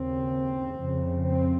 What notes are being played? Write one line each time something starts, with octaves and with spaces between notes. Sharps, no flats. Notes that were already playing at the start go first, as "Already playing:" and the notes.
Already playing: D#2 C#3 C4
F2 C#3
C4